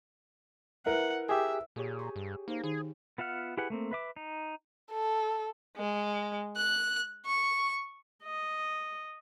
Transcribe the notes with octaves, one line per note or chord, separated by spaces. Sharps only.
E4 A#4 B4 F#5
G4 G#4 E5
A#2 G4 G#4 C#5
C#6
G2
A#3 D#4 C5 F5
D#3 D#4 G#4
B3 F4 E5 F#5 F6
E4 G4 G#4 B4 F#5
A3 A#3 C4
B4 E5 D6
D#4
A4
G#3
F#6
C#6
D#5